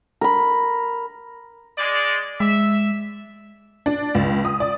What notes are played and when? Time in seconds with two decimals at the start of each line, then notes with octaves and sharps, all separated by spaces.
0.21 A#4 B5
1.78 G#3 D5
2.40 G#3 E5
3.86 D4
4.15 C#2
4.45 D#6
4.60 D5